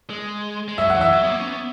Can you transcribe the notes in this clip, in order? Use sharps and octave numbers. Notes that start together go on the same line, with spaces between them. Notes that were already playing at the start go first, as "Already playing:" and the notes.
G#3
G#3
F#3 E5
F#5
E3
E5
F#3
B3
A#3
C#4
B3